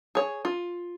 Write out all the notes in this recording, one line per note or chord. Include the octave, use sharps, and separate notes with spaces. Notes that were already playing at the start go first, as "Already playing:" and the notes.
G#4 C#5
F4